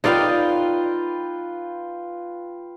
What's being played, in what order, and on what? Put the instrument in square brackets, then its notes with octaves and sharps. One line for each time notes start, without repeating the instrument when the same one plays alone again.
[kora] D#4 D5 F5 [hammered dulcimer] F4 B4 G5